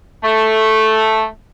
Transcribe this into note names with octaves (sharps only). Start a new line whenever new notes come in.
A3